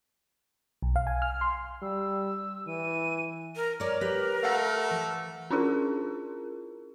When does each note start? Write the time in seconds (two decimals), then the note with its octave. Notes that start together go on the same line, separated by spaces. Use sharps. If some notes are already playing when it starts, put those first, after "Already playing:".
0.82 B1
0.96 F5
1.07 G#5
1.22 F6
1.41 C6
1.82 G3 E6
2.67 E3 D#7
3.56 A#4
3.80 A#4 C#5 D5
4.01 G4 B4
4.43 A3 F5 F#5
4.91 E3
5.51 C#4 D4 E4 F4 G#4 A#4